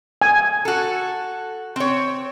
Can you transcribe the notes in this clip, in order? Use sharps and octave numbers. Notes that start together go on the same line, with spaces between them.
G#5
F#4 A4
C4 C#5